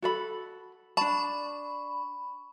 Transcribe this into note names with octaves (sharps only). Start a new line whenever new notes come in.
F#4 A4 B5
D4 A5 B5 C#6